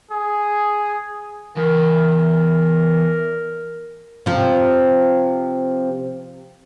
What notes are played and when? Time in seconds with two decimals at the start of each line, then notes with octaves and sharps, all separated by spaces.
0.11 G#4
1.57 E2 A#4
4.26 C3 F3